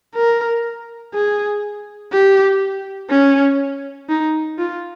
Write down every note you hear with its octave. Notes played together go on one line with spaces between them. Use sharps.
A#4
G#4
G4
C#4
D#4
F4